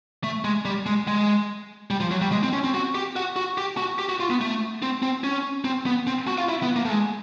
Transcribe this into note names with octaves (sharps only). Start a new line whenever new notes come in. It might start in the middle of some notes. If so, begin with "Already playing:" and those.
A3
G#3
G3
G#3
G#3
G3
F3
F#3
G3
G#3
C4
C#4
C4
F#4
G4
F#4
F#4
G4
F#4
G4
F#4
F4
B3
A3
C4
C4
C#4
C4
B3
C4
F#4
F4
E4
B3
A#3
A3
G#3